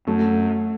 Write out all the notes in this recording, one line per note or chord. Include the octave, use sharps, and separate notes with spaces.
F#2 A3